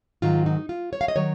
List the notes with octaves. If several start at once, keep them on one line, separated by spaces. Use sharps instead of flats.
G#2 D#3 F#3 F4
D#4
F4
C#5
F5
D#5
D#3 F#3 C#5